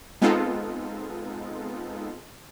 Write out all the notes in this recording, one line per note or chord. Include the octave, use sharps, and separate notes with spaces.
G#3 B3 C4 D#4 F4 A4